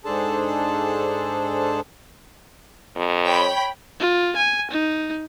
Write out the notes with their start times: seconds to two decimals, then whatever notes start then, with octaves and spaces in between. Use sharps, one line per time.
0.05 G#2 D4 G#4 A4 C5 A5
2.96 F2
3.25 C#5 G5 B5
4.00 F4
4.36 G#5
4.71 D#4